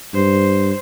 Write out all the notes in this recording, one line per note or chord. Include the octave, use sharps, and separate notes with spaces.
G2 C5